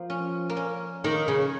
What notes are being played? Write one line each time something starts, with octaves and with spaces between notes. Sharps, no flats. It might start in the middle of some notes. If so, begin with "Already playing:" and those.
Already playing: F3 A#3
C#4
A#3
C#4
D#3 A#3
C#3